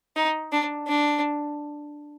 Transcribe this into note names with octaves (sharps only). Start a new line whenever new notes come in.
D#4
D4
D4